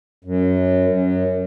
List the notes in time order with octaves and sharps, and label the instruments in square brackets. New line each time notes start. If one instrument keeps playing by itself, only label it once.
[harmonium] F#2
F#2